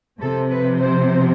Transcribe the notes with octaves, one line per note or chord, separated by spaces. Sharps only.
C3 F3 C4 A4
B4
C5